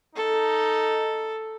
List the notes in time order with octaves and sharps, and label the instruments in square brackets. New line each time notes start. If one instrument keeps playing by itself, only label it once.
[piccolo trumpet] D#4 [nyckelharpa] A4